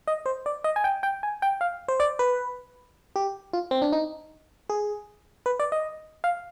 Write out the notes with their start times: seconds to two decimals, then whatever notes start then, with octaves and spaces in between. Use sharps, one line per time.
0.08 D#5
0.26 C5
0.46 D5
0.64 D#5
0.76 G#5
0.84 G5
1.03 G5
1.23 G#5
1.42 G5
1.61 F5
1.88 C5
2.00 D5
2.19 B4
3.16 G4
3.53 F4
3.71 C4
3.82 D4
3.93 D#4
4.69 G#4
5.46 B4
5.60 D5
5.72 D#5
6.24 F5